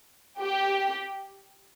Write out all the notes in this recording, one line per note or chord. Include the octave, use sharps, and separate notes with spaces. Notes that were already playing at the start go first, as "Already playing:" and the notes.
G4